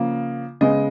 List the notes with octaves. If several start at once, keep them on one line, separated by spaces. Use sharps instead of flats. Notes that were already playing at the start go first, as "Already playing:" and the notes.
Already playing: C#3 F3 A#3
C#3 G#3 B3 D#5